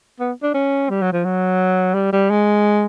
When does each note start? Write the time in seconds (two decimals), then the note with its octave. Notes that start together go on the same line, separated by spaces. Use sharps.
0.20 B3
0.43 D4
0.54 C#4
0.90 G3
1.02 F#3
1.13 F3
1.25 F#3
1.94 G3
2.12 G3
2.30 G#3